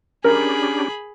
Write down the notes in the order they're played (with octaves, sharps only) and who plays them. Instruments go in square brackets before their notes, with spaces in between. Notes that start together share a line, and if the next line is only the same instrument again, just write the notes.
[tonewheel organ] C#4 D4 G4 [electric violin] G#4 B5 [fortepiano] A#4